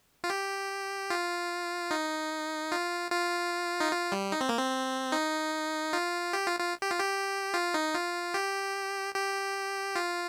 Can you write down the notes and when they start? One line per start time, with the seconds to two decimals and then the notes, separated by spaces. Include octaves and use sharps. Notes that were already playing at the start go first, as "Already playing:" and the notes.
0.24 F4
0.30 G4
1.10 F4
1.91 D#4
2.72 F4
3.11 F4
3.80 D#4
3.92 F4
4.12 G3
4.32 D#4
4.41 C4
4.49 A#3
4.58 C4
5.12 D#4
5.93 F4
6.33 G4
6.47 F4
6.60 F4
6.82 G4
6.91 F4
7.00 G4
7.54 F4
7.74 D#4
7.94 F4
8.34 G4
9.14 G4
9.96 F4